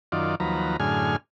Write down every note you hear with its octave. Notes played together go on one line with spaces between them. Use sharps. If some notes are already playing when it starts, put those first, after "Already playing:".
F#2 D#3 F4 D5
D#2 F3 F#3 B4 A#5
F#2 A2 D3 G#4 G#5 F6